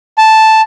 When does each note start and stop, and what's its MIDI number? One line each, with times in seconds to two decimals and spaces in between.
0.18 0.61 81